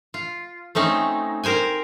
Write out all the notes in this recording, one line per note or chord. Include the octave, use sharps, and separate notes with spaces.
F4
A3 C4 C#4 D#4
A#4 C5 G5 G#5